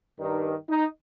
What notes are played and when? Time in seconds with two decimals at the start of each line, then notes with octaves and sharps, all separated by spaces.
0.19 G2 D#3 D#4
0.69 D#4